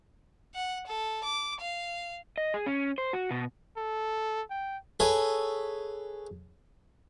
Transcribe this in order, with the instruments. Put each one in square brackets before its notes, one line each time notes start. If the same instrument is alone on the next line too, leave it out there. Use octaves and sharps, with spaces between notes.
[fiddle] F#5
A4
D6
F5
[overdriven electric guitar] D#5
G#4
C#4
C5
F#4
B2
[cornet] A4
G5
[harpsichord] G#4 A4 B4 C#5 E5